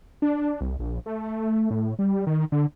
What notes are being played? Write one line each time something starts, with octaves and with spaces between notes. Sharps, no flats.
D4
C2
A#1
A3
A2
G3
D#3
D3